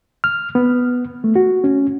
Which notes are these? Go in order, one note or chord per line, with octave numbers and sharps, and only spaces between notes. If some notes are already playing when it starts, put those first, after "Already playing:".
F6
B3
A3
F#4
C#4